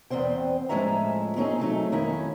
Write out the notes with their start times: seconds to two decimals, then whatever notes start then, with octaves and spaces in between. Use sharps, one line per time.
0.10 E2 B3 C4 C5 G5
0.69 A2 F3 G#3 C#4 E5 A#5
1.36 C4 C#4 D#4 G#4
1.60 F#3 A3 D#4
1.92 F2 D#3 C#4 E4